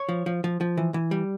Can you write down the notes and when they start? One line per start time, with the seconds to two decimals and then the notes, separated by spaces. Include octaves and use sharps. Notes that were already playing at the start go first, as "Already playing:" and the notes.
Already playing: C#5
0.09 F3
0.26 F3
0.44 F3
0.61 F3
0.77 E3
0.94 E3
1.11 G3